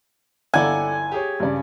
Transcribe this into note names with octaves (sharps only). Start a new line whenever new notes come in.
G1 E4 A4 D5 F#5 G#5 A#5
G4 G#4 C#5
G2 C#3 G3 D5